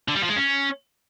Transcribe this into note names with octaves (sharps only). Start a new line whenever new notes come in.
D3
G3
F3
G#3
C#4